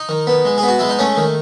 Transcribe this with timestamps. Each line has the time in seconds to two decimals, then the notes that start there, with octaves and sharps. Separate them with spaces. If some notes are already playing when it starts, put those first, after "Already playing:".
Already playing: D#4
0.09 D#3
0.27 B3
0.45 G#3
0.58 G#4
0.63 B3
0.68 F#4
0.79 G#3 E4
0.89 D#4
0.99 A3 C#4
1.17 D#3